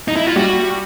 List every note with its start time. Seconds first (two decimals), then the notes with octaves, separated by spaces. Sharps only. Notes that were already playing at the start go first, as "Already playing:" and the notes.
0.08 D#4
0.17 E4
0.27 F4
0.36 G3 F#4